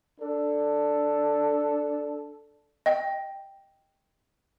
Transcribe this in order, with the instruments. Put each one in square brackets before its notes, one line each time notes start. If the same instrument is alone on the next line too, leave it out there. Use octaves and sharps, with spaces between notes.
[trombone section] D4 A4
[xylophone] D#5 G5